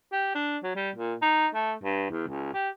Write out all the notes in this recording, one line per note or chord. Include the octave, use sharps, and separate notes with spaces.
G4
D4
F#3
G3
A#2
D#4
A3
G2
E2
C#2
G4